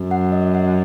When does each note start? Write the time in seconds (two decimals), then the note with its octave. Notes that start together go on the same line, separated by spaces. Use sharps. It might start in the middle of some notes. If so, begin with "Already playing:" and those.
Already playing: F#2
0.11 F#5
0.32 D#5
0.55 F#5